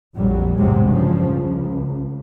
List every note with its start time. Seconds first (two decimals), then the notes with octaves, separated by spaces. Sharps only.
0.16 A#1 F2 F#3 G3
0.57 A1 E2 G#2 C3 F#3 G#3
0.86 G2 C#3 F3
1.30 C#2